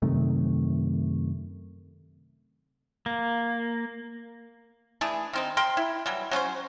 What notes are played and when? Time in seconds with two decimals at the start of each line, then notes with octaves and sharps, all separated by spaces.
0.02 F#2 C3 D#3 A3
3.06 A#3
5.01 E3 A3 D4 G#4
5.33 D#3 C4 D#4
5.57 A#4 G5 C6
5.77 E4
6.06 E3 F#3 G3
6.31 F#3 C#4 F4 C5